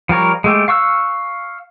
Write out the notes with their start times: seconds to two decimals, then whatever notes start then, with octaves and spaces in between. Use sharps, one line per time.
0.09 F3 G3 A#4 C#5
0.44 G#3 A3 G4
0.68 F5 C#6 E6 F#6